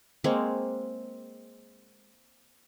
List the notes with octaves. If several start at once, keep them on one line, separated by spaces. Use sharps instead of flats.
G#3 A#3 C4 C#5